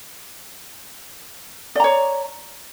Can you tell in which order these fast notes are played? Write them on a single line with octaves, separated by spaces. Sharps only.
D5 A#5 C#5